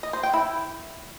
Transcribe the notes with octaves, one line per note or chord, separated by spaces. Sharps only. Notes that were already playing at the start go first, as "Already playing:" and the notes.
D#5
C5
G5
E4